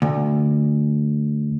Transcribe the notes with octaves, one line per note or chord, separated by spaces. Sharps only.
D2